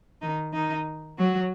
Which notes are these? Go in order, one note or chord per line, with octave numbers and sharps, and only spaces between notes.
D#3 D#4
D#3 D#4
F#3 F#4